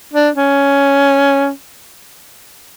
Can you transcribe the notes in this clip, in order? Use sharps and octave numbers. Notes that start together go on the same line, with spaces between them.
D4
C#4